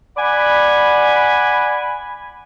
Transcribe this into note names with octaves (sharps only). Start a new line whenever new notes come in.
D5 F#5 G#5 B5